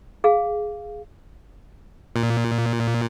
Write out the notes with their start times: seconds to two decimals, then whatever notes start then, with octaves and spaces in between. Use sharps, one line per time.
0.24 G#4 F5
2.16 A#2